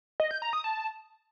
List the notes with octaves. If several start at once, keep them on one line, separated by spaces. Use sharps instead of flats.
D#5
G6
A#5
D#6
A5